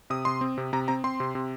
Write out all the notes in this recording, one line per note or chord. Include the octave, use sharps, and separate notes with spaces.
C3 D#6
C3 C6
C4
C3
C3 A#5
C4 A#5
C4 C6
C3
C3